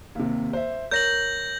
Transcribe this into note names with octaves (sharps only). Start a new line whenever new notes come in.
D#2 C3
C5 E5
A#4 C#5 G6 A#6 F#7